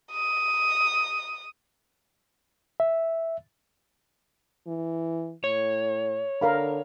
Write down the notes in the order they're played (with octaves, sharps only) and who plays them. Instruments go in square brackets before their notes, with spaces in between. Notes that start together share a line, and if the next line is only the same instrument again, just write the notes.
[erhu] D#6
[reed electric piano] E5
[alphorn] E3
[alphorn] A2 [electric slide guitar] C#5
[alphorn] D3 [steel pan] A#4 F5 B5